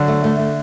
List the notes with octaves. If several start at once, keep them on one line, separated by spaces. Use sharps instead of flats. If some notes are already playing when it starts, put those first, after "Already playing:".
Already playing: D3 F#3
A3
A3
A3